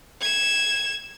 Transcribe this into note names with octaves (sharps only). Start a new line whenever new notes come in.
G#6 E7